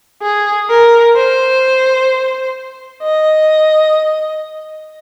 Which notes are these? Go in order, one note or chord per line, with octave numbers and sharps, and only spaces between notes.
G#4
A#4
C5
D#5